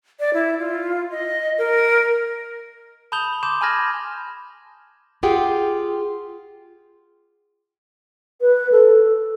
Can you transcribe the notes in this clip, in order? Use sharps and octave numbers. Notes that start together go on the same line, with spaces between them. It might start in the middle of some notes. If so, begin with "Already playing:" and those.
D5
E4
F4
D#5
A#4
A5 B5 D#6 G6 F7 G7
C6 D6 G6 E7
G#5 A5 B5 F6 G#6 A#6
F4 G4 G#4 F#5 G5
B4
A4